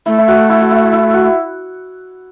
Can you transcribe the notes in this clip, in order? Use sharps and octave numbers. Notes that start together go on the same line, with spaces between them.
A3 E4
E4
F#4
E4
F#4
E4
E4
F#4